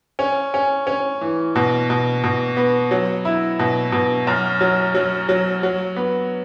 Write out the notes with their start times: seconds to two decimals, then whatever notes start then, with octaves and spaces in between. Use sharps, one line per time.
0.19 C#4
0.54 C#4
0.87 C#4
1.21 E3
1.56 B2
1.90 B2
2.24 B2
2.57 B3
2.91 F#3
3.25 E4
3.59 B2
3.92 B2
4.27 F#2
4.61 F#3
4.95 F#3
5.29 F#3
5.63 F#3
5.96 B3